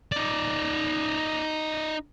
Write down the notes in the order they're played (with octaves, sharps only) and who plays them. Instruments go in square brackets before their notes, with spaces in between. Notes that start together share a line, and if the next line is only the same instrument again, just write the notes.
[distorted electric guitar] D#4 D5